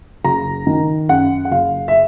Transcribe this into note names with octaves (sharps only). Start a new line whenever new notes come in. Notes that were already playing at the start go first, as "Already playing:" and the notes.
F#1 A#5
D#3
F#2 F#5
F#5
F#1 F5
E5